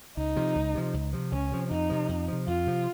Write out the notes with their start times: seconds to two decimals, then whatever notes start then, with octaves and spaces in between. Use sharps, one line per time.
0.17 C#2 D#4
0.36 C3 F3
0.56 C#2
0.75 C3 F3
0.94 C#2
1.13 C3 F3
1.32 C#2 C#4
1.52 C3 F3
1.71 F2 D#4
1.90 C3 F3
2.09 F2
2.28 C3 F3
2.47 F2 F4
2.67 C3 F3